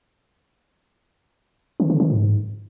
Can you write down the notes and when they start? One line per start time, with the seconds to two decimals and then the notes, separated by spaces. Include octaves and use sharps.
1.80 D#3
1.90 D3
2.00 D#3
2.10 G#2